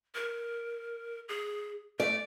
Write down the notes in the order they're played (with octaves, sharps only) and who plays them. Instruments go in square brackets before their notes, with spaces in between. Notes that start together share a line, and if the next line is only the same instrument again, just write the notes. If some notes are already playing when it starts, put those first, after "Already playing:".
[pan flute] A#4
G#4
[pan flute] A3 [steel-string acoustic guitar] D5